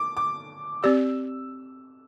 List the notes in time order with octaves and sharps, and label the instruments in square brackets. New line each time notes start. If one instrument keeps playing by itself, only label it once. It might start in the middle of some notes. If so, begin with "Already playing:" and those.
Already playing: [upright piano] D6
D6
[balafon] C4 G4 D5 [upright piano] E6